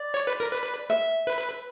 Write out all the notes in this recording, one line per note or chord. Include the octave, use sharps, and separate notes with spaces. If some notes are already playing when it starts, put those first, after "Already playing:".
Already playing: D5
C#5
B4
A#4
B4
E5
B4